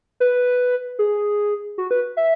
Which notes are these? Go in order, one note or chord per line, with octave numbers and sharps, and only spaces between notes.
B4
G#4
F#4
B4
E5